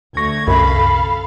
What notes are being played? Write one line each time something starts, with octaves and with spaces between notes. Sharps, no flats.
D2 A3 C#6 G#6 A#6
C2 F#2 A4 F5 B5